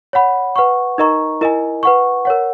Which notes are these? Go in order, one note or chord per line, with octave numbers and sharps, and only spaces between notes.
C#5 F#5 B5
B4 F#5 C#6
D#4 A#4 D#5 A#5 C#6
E4 A#4 D#5 G#5
B4 F#5 C#6
A#4 C#5 F#5